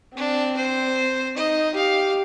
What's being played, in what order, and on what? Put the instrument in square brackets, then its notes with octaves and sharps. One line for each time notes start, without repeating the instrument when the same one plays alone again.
[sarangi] C4 [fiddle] D4
[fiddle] C5
[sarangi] D#4 [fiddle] D#5
[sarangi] G4 [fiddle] F5